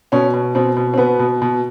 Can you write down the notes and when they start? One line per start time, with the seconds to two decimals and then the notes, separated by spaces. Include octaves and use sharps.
0.12 B2 C#4
0.34 B2
0.55 B2 C4
0.77 B2
0.94 C4
0.98 B2 B3
1.19 B2
1.42 B2